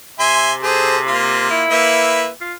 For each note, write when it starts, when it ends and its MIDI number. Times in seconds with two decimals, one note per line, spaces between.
0.19 1.46 48
0.19 0.53 76
0.19 0.53 80
0.19 0.53 84
0.63 0.99 68
0.63 0.99 69
0.63 0.99 72
1.07 1.65 58
1.07 1.65 65
1.51 2.27 64
1.71 2.29 58
1.71 2.29 71
1.71 2.29 76
2.41 2.54 65